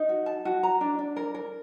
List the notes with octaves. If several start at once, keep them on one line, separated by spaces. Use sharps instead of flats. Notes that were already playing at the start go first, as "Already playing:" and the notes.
Already playing: D#4
F#4
A5
F#4
A#5
D4
D4
A#4
A#4